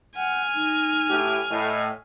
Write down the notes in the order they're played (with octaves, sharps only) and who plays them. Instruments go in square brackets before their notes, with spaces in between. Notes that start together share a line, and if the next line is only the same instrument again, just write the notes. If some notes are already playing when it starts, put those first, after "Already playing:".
[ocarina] F#5 [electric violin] G#5 F6
[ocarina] D#4
[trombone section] A2 G4
[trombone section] A2 [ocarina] D#5